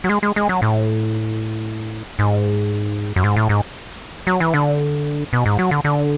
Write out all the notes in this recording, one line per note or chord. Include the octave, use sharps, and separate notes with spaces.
F#3
G#3
G#3
G#3
F#3
A2
G#2
F#2
G#2
A2
G#2
F#3
E3
D3
B2
G#2
F#3
D3
D3